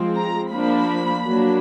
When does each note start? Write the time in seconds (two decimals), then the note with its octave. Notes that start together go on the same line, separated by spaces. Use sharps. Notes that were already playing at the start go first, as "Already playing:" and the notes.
Already playing: F3 G#3 C4
0.16 A#5
0.52 F3 A#3 D4 B5
1.26 F#3 A#3 D4